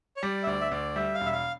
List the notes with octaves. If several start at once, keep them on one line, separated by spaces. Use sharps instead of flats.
C#5
G3 D5
E5
D2 D5
E5
D2 D5
G3 E5
F5
E1
E5
F5